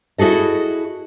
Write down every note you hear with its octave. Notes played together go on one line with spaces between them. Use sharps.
E4 F#4 G#4 A4 D#5